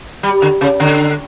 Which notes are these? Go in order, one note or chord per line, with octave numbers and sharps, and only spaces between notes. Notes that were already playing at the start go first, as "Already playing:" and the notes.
G3
D3
C#3
D3